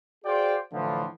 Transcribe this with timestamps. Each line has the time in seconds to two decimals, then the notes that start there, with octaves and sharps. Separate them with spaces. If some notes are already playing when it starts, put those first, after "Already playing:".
0.25 F#4 G#4 C5 D5 F5 G5
0.72 A2 D3 E3 F3